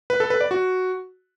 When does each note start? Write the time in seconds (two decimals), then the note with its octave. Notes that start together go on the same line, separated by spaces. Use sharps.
0.10 B4
0.20 A4
0.30 B4
0.41 D5
0.51 F#4